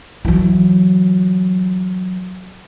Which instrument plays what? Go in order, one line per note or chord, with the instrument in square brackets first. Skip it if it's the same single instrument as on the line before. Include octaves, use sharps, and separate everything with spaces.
[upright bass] E3 F#3